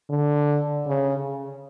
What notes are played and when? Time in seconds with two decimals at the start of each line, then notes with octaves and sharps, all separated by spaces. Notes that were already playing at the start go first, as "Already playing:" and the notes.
0.10 D3
0.87 C#3